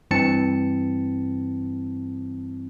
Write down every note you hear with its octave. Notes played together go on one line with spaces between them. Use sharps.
G2 E3 C4 A5 C#7